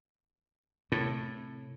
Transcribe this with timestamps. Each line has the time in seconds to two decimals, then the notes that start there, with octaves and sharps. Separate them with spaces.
0.92 A2 C3